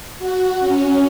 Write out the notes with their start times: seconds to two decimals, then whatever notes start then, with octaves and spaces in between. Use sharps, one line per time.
0.19 F#4
0.60 C#4